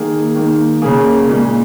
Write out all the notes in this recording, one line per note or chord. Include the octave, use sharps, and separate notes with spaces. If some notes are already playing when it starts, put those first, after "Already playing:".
Already playing: D#3 A#3 G#4
D#3 A#3
C#3 A#3 G#4
A#2 G#3